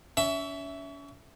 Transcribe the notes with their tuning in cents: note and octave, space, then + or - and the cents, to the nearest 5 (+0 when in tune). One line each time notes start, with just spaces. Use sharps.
C#4 +35 E5 +0